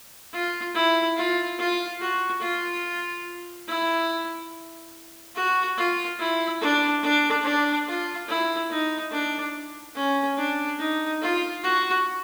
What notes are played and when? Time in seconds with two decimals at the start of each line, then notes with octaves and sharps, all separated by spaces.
0.33 F4
0.75 E4
1.16 F4
1.59 F4
2.01 F#4
2.41 F4
3.68 E4
5.35 F#4
5.77 F4
6.19 E4
6.61 D4
7.03 D4
7.44 D4
7.87 F4
8.28 E4
8.70 D#4
9.11 D4
9.95 C#4
10.37 D4
10.79 D#4
11.21 F4
11.63 F#4